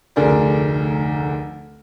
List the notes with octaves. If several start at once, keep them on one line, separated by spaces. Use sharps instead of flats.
F1 D2 D3 G#4 A#4 D5